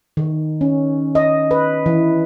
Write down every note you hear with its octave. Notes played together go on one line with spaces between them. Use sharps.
D#3
C#4
D#5
B4
E3